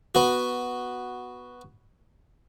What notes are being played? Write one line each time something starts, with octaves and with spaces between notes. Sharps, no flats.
B3 F#4